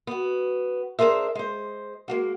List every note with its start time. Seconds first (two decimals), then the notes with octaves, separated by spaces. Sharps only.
0.07 B3 F#4
0.99 D4 G#4 A#4 C5 E5
1.35 G#3 C5
2.08 G#3 A#3 F#4